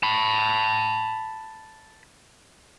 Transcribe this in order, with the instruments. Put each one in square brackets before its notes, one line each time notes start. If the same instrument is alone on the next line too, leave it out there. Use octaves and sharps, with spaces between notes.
[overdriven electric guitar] A5 B5